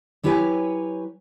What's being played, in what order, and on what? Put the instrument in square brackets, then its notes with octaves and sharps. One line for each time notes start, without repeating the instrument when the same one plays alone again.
[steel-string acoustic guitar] F#3 E4 G4 B4 C#5 G#5